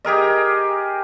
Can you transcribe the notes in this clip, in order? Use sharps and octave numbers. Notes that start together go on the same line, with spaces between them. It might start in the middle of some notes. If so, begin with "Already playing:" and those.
G4 G#4 A#4 D#5